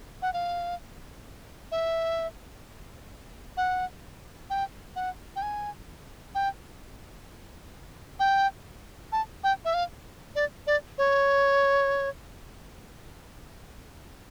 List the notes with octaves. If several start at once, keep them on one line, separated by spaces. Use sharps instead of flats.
F#5
F5
E5
F#5
G5
F#5
G5
G#5
G5
G5
A5
G5
E5
F5
D5
D5
C#5